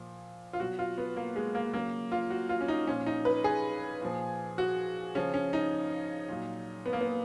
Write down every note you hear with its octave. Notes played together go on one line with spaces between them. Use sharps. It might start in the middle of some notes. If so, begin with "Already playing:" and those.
Already playing: A#2 F3
F4
B2 F#3 F#4
F4
B3
A#3
G#3
A#3
C#3 F#3 A#3
F4
F#4
F4
C#4
D#4
A#2 F3 C#4
D#4
B4
G#4
A#2 F3
F#4
C#3 F3 C#4
C#4
D#4
A#2 F#3
B3
A#3
B3